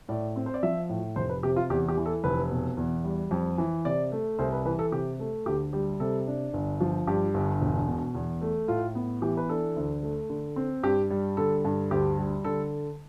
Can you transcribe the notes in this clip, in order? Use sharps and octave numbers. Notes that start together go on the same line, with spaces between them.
A2 D5
C4
C5
D5
F3 E5
A2
F1 C5
B4
C3 G4
F4
E2 G4
G4
E3
A4
F1 B4
B2
E2
G3
F2
E3
C3 D5
A3
C2 C5
B4
E3 B4
A4
C3 G4
A3
D2 G4
G3 G4
C3 A4
D4
G1
F3
G2 G4
G1
E1
B2
E2
A3
A2 F4
B3
E3 G4
B4
D4 A4
D2
A3
D3
C4
G2 G4
G3
D3 A4
G2
D2 G4
G3
D3 A4